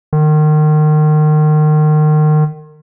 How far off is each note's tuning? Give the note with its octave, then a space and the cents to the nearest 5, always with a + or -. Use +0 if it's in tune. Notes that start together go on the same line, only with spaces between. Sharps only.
D#3 -30